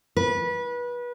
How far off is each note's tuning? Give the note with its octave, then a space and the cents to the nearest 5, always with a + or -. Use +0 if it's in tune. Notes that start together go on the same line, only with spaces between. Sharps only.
B4 -25